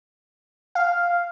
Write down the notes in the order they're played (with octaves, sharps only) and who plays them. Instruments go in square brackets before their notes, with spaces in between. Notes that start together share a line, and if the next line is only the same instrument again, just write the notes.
[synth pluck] F5